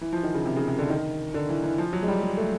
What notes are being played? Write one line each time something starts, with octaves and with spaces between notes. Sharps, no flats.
E3
F3
D#3
C#3
C3
C#3
C3
D3
D#3
D3
E3
E3
F3
F#3
G#3
G3
G#3
A3